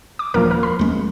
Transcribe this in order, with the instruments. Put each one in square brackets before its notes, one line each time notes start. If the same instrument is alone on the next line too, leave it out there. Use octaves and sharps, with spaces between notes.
[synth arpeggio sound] D6
[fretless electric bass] D#1 [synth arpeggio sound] F3 A#3 A#4
[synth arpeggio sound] A#4
B5
[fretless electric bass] D#2 G#3 C#4